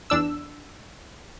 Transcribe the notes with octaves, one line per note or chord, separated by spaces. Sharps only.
E2 D4 E6